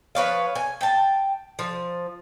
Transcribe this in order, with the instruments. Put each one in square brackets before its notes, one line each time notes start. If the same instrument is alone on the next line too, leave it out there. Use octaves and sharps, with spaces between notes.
[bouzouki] F3 B4 C#5 F5
G#5
G5 A5
F3